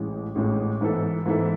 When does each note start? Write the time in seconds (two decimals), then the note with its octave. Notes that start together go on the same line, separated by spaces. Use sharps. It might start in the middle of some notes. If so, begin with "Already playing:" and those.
Already playing: A1 A2 G#3
0.35 A1 A2 G#3
0.81 G#2 E3 B3 E4 A4
1.25 G#2 E3 B3 E4 A4